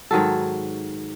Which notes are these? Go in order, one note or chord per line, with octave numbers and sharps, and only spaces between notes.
G#2 D#3 F#3 A4